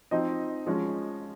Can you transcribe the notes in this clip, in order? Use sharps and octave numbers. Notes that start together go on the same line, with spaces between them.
F3 C4 D#4 D#5
F3 G#3 C#4